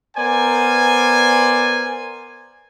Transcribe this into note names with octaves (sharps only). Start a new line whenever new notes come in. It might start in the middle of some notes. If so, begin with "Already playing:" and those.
B3 A#4 C5 D5 G#5